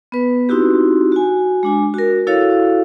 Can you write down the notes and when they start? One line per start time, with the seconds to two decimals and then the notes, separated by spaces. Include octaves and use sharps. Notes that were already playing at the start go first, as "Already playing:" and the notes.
0.12 B3 B4
0.49 C4 D#4 E4 F#4 G4
1.12 F#4 G#5
1.63 G#3 D4 G#5
1.94 F#4 A#4
2.27 E4 F#4 A4 C#5 F5